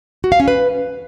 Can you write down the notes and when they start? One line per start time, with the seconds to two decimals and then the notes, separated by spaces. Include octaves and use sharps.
0.24 F#4
0.32 F5
0.40 C#4
0.48 B4